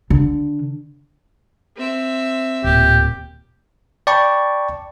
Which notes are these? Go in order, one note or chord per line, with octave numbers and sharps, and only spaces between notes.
D3
C4 E5
D1 A#2 G4
D5 G5 A5 B5 C#6